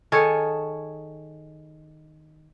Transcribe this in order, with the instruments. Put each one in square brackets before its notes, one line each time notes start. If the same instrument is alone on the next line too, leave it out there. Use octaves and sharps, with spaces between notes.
[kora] D#3 G#4 A4 C#5